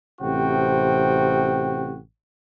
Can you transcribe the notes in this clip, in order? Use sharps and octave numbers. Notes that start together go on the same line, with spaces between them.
A1 C3 C4 F#4 G5